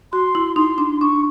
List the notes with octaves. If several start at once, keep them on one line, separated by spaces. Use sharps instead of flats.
F#4 C6
E4
D#4 C6
D4
D4 C#6